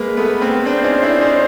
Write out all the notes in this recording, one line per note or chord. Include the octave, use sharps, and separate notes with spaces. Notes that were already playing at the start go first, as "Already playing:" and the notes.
Already playing: G#3 A#3 B4
A3 B3
A#3 C4
C4 D4 C5
C#4 D#4
D4 E4
C#4 D#4